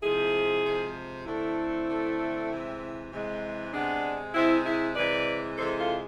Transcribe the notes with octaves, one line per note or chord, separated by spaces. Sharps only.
C3 F3 G#3 E4 G#4
C3 F3 G#3
D3 A3 C4 E4
D3 A3
C3 E3 G#3
C3 E3 G#3
C3 G#3 B3 D4
C3 G#3 C4 E4
E4 G#4
C3 E3 G#3 B4 D5
C3 E3 G#3 A4 C5
F4 A4